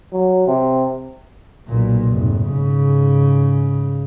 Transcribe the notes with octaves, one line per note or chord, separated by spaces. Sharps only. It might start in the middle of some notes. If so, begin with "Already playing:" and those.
F#3
C3
B1 A#2
F1 G#2
G#2 C#3